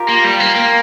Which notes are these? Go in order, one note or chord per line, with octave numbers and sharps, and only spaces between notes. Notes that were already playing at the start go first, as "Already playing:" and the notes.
Already playing: F4 G4 A#4
A#3
G3
A#3
A#3